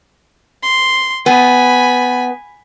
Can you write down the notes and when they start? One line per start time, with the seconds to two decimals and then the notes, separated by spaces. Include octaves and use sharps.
0.63 C6
1.26 B3 G#5 B5